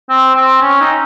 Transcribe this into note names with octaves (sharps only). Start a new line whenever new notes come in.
C4
C4
C#4
D#4